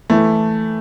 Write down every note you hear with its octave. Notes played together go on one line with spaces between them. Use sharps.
E3 A3